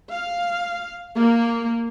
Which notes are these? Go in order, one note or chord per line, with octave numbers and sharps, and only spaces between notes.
F5
A#3